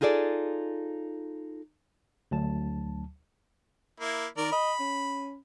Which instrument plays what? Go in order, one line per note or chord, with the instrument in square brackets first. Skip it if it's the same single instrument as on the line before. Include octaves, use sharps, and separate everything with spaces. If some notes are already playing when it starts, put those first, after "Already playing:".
[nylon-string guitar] D#4 F4 G#4 A4 D5
[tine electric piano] D2 F#3 A5
[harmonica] A#3 E4
[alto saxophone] D#3 [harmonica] A#4 D5
[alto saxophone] D#5 [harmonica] B5
[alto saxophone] C#4